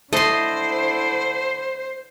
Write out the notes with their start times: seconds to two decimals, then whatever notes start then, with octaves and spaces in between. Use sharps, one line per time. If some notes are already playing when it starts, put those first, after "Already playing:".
0.13 D3 A3 E4 A4 C5 D#5 C6